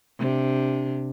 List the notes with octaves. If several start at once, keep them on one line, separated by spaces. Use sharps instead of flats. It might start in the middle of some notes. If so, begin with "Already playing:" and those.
C3 D4